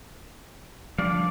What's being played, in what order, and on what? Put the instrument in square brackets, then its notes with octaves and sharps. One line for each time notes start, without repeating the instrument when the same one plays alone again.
[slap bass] F3 G3 [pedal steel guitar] D4 D5 F5